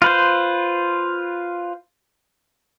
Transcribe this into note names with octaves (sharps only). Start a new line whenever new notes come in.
F4 B4 C5